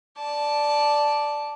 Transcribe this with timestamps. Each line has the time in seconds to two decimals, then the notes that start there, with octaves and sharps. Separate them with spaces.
0.18 D5 A5